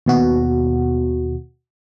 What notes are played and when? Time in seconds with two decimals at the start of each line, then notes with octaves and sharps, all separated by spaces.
0.06 D#2 B2 F#4